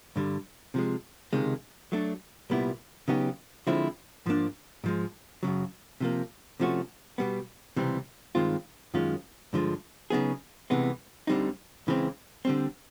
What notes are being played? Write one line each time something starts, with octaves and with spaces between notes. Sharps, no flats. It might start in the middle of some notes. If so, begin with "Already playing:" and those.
G2 D3 G3
C3 F3 G#3
C#2 C3 D#3 G#3
F#3 A3 D4
C2 A#2 G3 B3 E4
C#3 F#3 B3 D#4 G4
D3 F3 G#3 C4 E4
G#2 F3 A#3 D4
G#2 F3 G#3
F#2 C#3 F#3
C3 F3 A#3
C3 F3 A3 C#4 F#4
B2 G3 B3
C#2 C3 E3 G3 C4
G2 D#3 G#3 C4 F4
F#2 D#3 G#3 C#4 F4
G2 D3 F3 G#3
C#3 F#3 B3 D#4 G#4
C2 C3 E3 G#3 B3
D2 D3 G3 C4 D#4
C#2 C#3 E3 G#3 C4
D3 G3 C4